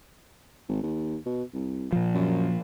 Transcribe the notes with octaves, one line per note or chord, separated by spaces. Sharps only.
G#1
D#2
B2
C2
A#2 F3
F#2